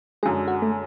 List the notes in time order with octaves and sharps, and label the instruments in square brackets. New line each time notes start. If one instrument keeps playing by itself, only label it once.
[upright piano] F#2 D3 G#3 [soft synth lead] G#4
[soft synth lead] F#4
A3